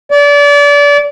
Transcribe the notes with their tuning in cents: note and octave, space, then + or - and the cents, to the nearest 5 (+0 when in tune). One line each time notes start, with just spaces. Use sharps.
D5 -30